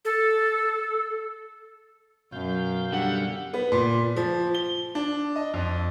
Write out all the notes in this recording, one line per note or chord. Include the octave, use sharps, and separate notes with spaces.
A4
F#2 B2 F5 G6
D3 G3 F#5
B3
A#2
F3
G7
D4
D#5
F2